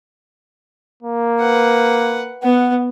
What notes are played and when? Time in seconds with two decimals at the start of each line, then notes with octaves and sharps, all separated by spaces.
1.03 A#3
1.41 B4 F#5
2.43 B3 F#5